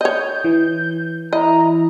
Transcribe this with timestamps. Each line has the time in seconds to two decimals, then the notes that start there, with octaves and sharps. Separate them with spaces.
0.01 C#5 D#5 G6
0.44 E3
1.33 E4 D#5 A#5